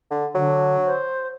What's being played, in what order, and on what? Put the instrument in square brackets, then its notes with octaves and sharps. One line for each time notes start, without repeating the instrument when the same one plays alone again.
[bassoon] D3
[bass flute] D3 [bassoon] F#3
[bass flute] C5